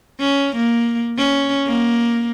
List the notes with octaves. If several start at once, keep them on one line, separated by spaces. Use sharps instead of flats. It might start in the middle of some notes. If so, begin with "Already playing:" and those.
C#4
A#3
C#4
A#3